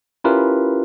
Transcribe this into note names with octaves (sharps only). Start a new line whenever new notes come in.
C#4 E4 F4 G4 A#4 B4